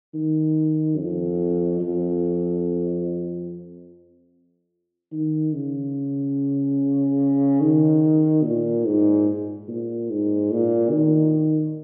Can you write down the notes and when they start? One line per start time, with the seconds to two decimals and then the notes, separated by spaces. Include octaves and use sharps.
0.14 D#3
0.97 F2
1.80 F2
5.12 D#3
5.53 C#3
7.61 D#3
8.43 A#2
8.85 G#2
9.68 A#2
10.10 G#2
10.51 A#2
10.92 D#3